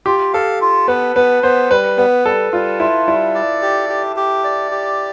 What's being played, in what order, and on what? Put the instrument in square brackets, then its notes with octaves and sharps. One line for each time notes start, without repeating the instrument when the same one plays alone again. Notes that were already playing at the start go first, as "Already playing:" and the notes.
[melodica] F4 [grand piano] G4
[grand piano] A4 [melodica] F5
[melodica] F4
[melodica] B3 [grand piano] B4
[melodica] B3 [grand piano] B4
[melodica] B3 [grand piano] C5
[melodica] G3 [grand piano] B4
[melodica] B3 [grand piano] B4
[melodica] G3 [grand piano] A4
[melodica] G3 [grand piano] F4
[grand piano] E4 [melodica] F4
[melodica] G3 [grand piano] E4
[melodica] D5
G4
G4
G4
D5
G4